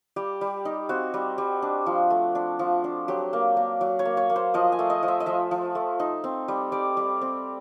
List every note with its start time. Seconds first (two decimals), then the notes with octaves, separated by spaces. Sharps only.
0.16 G3 G4
0.41 G3
0.65 D#4
0.89 C4 F#4
1.14 G3
1.38 G3
1.62 D4
1.86 F3
2.10 A3
2.35 D4
2.59 F3
2.84 D4
3.08 F#3 G4
3.33 A#3
3.57 A#3
3.81 F#3
3.99 C#5
4.05 A#3
4.17 C#5
4.30 A#3
4.36 C5
4.54 F3 D#5
4.72 G#5
4.79 A3
4.90 D#5
5.03 F3
5.08 E5
5.20 D#5
5.26 F3 E5
5.51 F3
5.75 A3
6.00 D#4
6.24 C4
6.48 G3
6.72 G3 D5
6.97 G3
7.21 C4